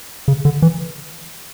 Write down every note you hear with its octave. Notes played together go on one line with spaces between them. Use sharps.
C#3
D3
E3